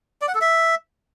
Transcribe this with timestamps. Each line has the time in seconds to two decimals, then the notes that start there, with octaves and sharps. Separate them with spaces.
0.22 D5
0.28 F#5
0.35 A4
0.41 E5